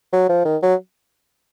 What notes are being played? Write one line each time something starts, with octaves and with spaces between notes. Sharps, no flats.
F#3
F3
D#3
F#3